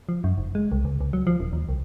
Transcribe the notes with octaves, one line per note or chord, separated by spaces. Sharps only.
F3
F#2
F1
G#3
C2
C#2
C#2
F#3
F3
D#1
D#2
C2